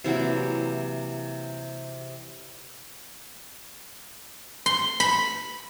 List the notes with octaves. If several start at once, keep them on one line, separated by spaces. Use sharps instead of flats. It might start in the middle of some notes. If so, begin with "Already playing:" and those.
C3 E3 F#3 A#3
C6
B5